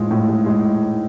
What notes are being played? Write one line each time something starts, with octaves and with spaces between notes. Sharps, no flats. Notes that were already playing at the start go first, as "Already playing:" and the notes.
Already playing: A2 G#3 F4
A2
G#3
G#3